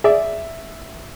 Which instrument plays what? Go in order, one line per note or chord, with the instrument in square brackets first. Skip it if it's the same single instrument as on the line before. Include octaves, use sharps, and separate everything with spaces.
[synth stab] G#4 D5 [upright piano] E5